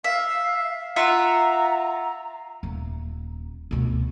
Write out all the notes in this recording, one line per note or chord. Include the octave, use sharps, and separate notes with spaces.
E5 F5
F4 E5 F#5 A#5
D#1
D2 B2